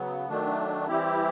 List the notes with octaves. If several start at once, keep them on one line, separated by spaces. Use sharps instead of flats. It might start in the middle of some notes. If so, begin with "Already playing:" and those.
Already playing: C#3 F#3 B3
D#3 F#3 A3 D4
E3 G3 C4 E4 G4